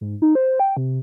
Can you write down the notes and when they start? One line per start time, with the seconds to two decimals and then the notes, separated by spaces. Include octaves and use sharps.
0.01 G#2
0.22 D#4
0.35 C5
0.60 G5
0.77 C3